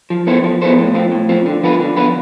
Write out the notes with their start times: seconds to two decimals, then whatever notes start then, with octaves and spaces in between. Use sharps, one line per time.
0.10 F3
0.27 B3 E4 A4 C5
0.44 F3
0.62 B3 E4 A4 C5
0.78 A2
0.94 F3 C4 F4
1.12 A2
1.29 F3 C4 F4
1.46 D3
1.63 F3 B3 F4 B4
1.80 D3
1.96 F3 B3 F4 B4